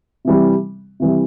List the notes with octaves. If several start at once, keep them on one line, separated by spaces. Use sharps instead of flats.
C3 E3 G3
C3 E3 G3